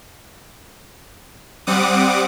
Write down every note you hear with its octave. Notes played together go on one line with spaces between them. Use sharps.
G3 C4 F#5 D6 D#6